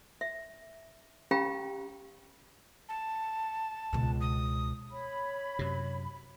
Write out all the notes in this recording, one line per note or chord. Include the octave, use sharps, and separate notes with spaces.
E5
C#4 G4 F5 G5 A#5 B5
A5
C#2 B2
D#6
C#5 B5
F#2 C3